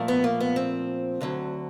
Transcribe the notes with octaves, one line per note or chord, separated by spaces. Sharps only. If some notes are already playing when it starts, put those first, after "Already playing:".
Already playing: A#2 F3 A3
B3
A#3
B3
C4
D2 D3 F#3